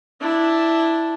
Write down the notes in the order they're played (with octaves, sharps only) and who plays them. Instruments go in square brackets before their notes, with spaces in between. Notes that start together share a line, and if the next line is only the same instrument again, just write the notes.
[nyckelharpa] D4 E4